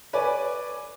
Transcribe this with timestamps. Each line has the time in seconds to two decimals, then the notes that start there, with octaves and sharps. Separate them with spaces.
0.13 B4 C#5 D5 G#5